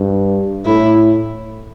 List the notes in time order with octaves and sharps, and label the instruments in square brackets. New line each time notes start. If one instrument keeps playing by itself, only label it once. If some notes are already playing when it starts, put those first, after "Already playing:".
Already playing: [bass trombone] G2
[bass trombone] A2 [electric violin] E4